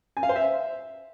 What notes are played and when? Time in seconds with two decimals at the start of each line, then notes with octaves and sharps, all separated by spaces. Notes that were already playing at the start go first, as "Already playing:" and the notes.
0.17 G#5
0.23 F5
0.29 C5
0.36 E5